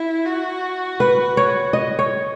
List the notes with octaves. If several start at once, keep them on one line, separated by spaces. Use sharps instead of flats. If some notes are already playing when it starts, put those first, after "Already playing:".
Already playing: E4
F#4
B4
C#5
D#5
C#5